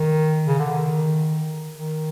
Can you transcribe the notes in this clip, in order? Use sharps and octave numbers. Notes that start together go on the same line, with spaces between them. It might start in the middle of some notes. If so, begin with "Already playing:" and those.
Already playing: D#3
C#3
D3
D#3
D#3